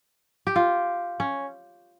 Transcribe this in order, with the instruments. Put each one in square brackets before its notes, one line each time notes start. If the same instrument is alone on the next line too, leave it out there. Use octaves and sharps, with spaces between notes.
[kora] G4
F4
C#4